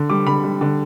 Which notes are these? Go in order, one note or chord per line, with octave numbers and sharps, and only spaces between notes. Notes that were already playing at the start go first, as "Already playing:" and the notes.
Already playing: D3
G3 D6
D3 B5
G3
D3